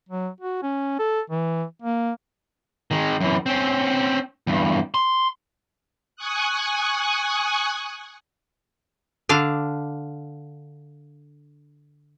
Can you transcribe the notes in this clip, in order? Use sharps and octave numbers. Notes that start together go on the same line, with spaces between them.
F#3
F#4
C#4
A4
E3
A#3
D#3 G#3
F#2 E3
C4 C#4
E2 G2
C6
G#5 C#6 D#6 F#6
D3 D4 F5